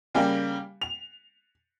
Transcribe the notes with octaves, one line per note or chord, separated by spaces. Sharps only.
C#3 G3 A#3 G4
F7